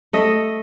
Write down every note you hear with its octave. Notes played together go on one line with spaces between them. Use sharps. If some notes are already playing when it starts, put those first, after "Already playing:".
A3 D#5